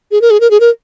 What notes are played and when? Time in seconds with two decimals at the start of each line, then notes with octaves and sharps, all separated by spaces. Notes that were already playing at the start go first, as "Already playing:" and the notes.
0.11 G#4
0.22 A#4
0.31 G#4
0.40 A#4
0.51 G#4
0.60 A#4